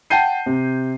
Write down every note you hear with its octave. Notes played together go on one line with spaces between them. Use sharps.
F#5 G5 A5 G6 C7 D#7
C3